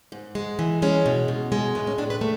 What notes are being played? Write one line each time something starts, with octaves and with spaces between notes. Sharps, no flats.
G#2
G#3
E3
G#3 C#4
B2
B2
G#3
A2 B3
C#4
A2 D4
B4
A3